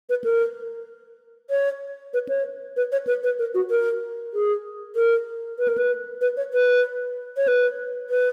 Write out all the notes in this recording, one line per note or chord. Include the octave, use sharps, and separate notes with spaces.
B4
A#4
C#5
B4
C#5
B4
C#5
B4
B4
A#4
F#4
A#4
G#4
A#4
B4
A#4
B4
B4
C#5
B4
C#5
B4
B4